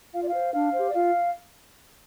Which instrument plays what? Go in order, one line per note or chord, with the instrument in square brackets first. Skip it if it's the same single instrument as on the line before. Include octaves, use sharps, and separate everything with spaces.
[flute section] F4 F5
D5
C5 F5
D4 F5
G4 C5
D5
F4 F5